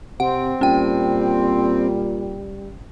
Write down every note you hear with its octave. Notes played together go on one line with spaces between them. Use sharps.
C3 C4 F#5
A#2 G3 C#4 G5